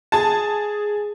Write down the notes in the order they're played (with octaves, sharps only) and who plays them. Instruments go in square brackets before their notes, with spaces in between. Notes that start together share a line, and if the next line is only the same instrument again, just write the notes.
[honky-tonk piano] G#4 A5